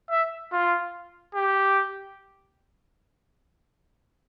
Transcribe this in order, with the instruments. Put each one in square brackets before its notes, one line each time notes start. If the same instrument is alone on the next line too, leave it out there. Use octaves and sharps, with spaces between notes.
[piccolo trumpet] E5
F4
G4